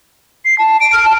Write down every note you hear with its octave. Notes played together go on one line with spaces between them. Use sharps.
C7
A5
D7
F6
A5